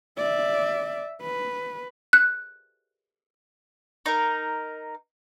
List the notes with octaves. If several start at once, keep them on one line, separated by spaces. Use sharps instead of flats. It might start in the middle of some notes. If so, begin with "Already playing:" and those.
D5 E5
B4
F#6
D#4 A#4